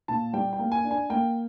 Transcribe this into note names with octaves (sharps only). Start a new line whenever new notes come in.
A#2 A5
G3 G5
G5
A#3
G#5
D4
G#5
A#3 G5